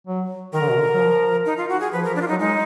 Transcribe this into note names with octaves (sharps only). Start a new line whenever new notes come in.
F#3
D#3 A#4
D3
B2
D3
F#3
F3
D#4
F4
F#4
G#4
F3 B4
A#4
D4
F4
D#4
F#3
G#3 D#4